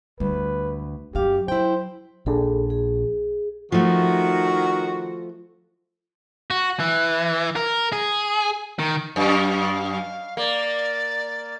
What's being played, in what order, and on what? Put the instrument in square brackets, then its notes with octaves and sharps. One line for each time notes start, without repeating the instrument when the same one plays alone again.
[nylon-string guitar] D2 [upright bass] G3 [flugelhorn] B4
[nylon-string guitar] F#2 F5 [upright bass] F#3 [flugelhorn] G4
[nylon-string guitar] E4 G5 [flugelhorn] C5
[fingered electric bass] A#1 D4 [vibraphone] G#4 A4
[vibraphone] G#4
[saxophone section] D#3 F#4 [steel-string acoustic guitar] F3 A3
[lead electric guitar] F#4
E3
A#4
G#4
D#3
[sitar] F#2 [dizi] F5
[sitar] A#3 [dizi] D5